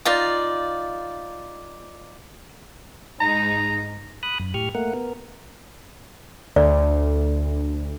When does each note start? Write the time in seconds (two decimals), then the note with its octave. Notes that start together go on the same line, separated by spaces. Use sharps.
0.05 D#4 F4 D5
3.20 G#2 G#3 D#4 A#5
4.23 B5 D#6 F#6
4.40 F#2
4.54 A2 G4 C#6 F6
4.75 A3 A#3 A#4 F#5
4.94 B3 A#4
6.56 D2 D5